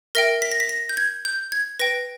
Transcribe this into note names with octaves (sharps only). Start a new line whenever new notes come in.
A#4 E5 G5 A#6
B6
A#6
B6
A#6
G6
G#6
G6
G#6
B4 G5 A#6